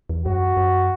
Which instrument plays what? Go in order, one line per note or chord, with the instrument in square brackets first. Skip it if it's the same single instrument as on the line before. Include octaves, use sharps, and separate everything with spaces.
[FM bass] E2
[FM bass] F#2 [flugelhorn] F#4
[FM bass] F#2